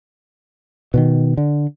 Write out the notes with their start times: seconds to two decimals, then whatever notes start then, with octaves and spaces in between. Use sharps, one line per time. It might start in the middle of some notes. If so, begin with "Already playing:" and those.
0.94 B2 D3 D#3
1.37 D3